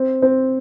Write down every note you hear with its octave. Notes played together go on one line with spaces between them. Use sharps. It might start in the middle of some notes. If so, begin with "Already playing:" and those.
Already playing: C4
C4